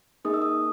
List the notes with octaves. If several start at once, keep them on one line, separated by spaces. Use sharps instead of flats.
A#3 D#4 G#4 D#6
E6
D#6